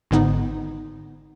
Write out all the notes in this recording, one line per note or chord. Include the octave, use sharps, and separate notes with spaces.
G#1 G#2 D3 B3 D#4